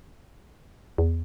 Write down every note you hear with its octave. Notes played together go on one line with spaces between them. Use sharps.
E2